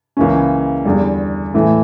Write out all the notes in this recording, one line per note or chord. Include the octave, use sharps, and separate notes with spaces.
C#2 C#3 E3 A#3 C#4
E2 D3 G3
A2 E3 A3